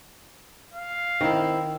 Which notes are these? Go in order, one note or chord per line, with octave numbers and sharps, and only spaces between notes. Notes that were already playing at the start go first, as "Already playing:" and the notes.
F5
D#3 C4 E4